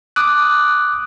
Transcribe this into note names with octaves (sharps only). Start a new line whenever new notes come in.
D6 D#6 F#6